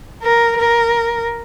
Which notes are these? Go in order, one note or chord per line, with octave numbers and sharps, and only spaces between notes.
A#4
A#4